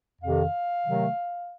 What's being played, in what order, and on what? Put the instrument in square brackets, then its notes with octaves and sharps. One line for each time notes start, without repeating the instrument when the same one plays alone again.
[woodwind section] F2 C3 D#3 F5
C3 D#3 F#3 A3